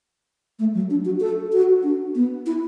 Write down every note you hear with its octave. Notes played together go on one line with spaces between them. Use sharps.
A3
F#3
D4
F#4
A4
F#4
D4
B3
E4